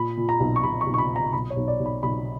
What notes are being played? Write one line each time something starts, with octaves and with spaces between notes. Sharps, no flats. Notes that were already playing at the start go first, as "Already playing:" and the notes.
Already playing: A#2 B5
A#2
A#5
B1
C#6
B1 B5
C#6
B1
C#6
B5
A#2
A#5
B1 B5
C#5
B1
D5
B1
B5
B1 B5